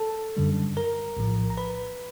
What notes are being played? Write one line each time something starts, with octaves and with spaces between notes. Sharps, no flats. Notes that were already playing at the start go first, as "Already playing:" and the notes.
Already playing: A4 A5
F#2 D3 G3
A#4 A#5
A#1 A2 F3
A#5
B4 B5